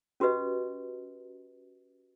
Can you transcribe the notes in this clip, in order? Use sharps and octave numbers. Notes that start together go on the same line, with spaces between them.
C#4 F#4 G4 B4 D#5